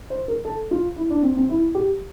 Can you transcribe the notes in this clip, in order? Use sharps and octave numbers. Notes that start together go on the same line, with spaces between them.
C5
A#4
A4
F4
E4
D4
C4
C4
E4
G4